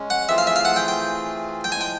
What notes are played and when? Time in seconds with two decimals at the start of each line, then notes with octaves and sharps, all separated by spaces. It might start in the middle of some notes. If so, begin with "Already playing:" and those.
Already playing: G#3 C#4
0.10 F#5
0.28 E3 A3 C4 F4 G#4 E5
0.38 F5
0.47 E5
0.56 F5
0.65 F#5
0.76 G5
0.88 G5
1.64 G5
1.72 A2 F3 G#3 G#5
1.81 G5